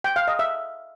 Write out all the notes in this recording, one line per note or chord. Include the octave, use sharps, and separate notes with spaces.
G5
F5
D#5
E5